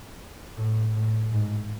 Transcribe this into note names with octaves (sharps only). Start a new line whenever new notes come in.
A2
A2
G#2